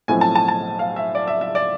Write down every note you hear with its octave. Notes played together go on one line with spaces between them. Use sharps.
B1 A2 F3 A3 C4 G#5
A5
A5
A5
F5
E5
D5
E5
E5
D5